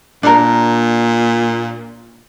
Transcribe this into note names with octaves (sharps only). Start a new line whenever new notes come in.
A#2 D4 A#4